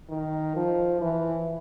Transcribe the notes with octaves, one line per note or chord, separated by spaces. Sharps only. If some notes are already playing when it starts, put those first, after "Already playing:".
D#3
F3
E3